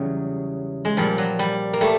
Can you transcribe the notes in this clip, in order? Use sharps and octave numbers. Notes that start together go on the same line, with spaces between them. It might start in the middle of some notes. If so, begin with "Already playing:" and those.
Already playing: E2 C#3 F#3 G3
G#3
A#2 F3 G3
F#3
G3
A#3
G3 A3